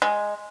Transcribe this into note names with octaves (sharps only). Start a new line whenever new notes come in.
G#3